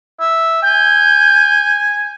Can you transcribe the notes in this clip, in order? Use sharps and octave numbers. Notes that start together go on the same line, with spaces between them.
E5
G#5 G6